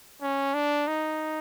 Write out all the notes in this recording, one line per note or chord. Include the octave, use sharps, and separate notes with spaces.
C#4
D4
D#4